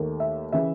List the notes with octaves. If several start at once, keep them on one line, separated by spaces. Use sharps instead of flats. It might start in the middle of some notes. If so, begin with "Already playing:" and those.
Already playing: D#2 D#3 A3
E5
C#3 E3 E5